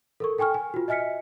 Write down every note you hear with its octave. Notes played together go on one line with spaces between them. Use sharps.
A4 A#4 C#6
A4 G5 G#5 C#6 F6
G#5
F4 F#4
D#5 E5 G#5 F6 B6 C#7